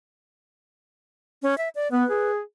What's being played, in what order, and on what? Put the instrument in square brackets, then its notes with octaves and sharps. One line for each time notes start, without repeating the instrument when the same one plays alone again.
[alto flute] C#4
E5
D5
[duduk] B3 [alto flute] B4
[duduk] G#4